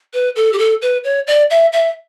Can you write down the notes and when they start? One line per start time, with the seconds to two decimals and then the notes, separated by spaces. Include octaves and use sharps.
0.14 B4
0.36 A4
0.53 G4
0.58 A4
0.82 B4
1.04 C#5
1.27 D5
1.50 E5
1.73 E5